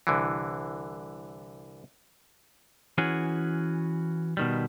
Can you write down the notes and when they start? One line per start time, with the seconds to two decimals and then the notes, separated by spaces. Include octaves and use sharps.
0.07 C2 D3 E3
2.98 E3 C#4 F#4 G#4
4.37 B2 D#3 G3